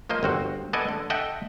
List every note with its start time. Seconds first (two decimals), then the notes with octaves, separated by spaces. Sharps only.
0.09 F3 A#3 C5 D#5
0.23 G1 C4 F#4
0.73 B3 A4 D5 D#5 G#5
0.88 D3
1.10 A4 D#5 E5 F#5 G5